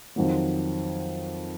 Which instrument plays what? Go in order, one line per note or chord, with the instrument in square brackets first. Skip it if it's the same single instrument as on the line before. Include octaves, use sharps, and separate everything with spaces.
[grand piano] F2 D#3 F#3